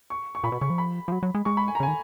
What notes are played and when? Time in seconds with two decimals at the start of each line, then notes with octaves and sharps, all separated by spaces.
0.10 C#6
0.35 C#6
0.43 A#2 B5
0.52 B2
0.61 C#3 C#6
0.70 F3
0.78 B5
1.08 F3
1.12 F#3
1.23 F#3
1.35 G#3
1.45 G#3 C#6
1.57 B5
1.68 G#5
1.75 A#5
1.80 C#3
1.83 D#3 G#5